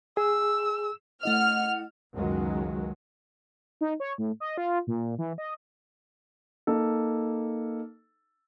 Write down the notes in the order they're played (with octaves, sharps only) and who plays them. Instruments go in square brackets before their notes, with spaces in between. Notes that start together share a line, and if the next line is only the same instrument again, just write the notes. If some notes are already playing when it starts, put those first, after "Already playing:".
[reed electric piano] G#4 [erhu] E6
[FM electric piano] A3 E4 D#5 [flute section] F#5 [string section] F6
[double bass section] C#2 F#2 D#3 F#3 G#3
[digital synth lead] D#4
C#5
A2
D#5
F4
A#2
E3
D#5
[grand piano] A#3 D#4 A4